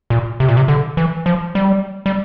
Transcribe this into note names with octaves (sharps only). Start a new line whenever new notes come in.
A#2
C3
A#2
C3
D3
E3
F3
G3
G3